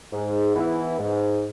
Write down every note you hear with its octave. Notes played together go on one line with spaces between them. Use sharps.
G#2
E3 B3 E4
G#2